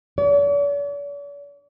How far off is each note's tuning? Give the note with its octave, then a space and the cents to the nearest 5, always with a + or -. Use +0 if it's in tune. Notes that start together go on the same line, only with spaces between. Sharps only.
D5 -45